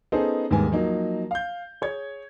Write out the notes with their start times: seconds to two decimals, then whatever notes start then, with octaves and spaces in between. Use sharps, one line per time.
0.12 B3 C#4 D#4 G#4 A4 C5
0.51 D#2 G#2 G3 B3 G#5
0.71 F3 F#3 A#3 D#4
1.31 F5 G6
1.81 G#4 C#5 G#6